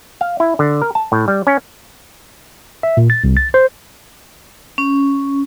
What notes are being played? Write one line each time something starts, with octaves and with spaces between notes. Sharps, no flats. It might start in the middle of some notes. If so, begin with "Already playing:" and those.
F5
E4
D3
A#4
A5
A2
G3
C#4
E5
A#2
A6
C2
A6
C5
C#4